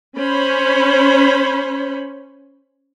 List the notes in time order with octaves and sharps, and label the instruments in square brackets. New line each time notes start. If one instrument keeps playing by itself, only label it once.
[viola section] C#4 C5 C#5 B5